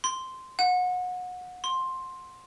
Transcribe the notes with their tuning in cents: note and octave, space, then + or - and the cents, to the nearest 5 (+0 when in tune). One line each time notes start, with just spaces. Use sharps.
C6 -5
F#5 -30
C6 +10